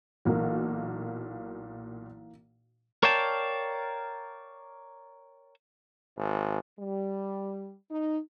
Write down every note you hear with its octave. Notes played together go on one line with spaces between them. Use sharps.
B1 A#2 E3 A#3 F#4
A#4 C#5 D5 F5 G5 A5
G#1
G3
D#4